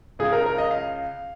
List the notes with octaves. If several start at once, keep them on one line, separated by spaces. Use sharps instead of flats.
C#2 C#3 G#4
A#4
A#4
D#5
F5